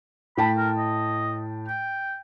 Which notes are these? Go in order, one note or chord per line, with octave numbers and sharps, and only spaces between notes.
A2 G5 A5 B5
A#4
D#5
G5